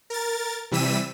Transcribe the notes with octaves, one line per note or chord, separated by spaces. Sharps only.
A#4 A6
C3 E3 G3 E6 B6 D#7